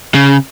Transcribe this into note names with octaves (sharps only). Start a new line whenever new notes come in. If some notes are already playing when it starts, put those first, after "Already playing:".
C#3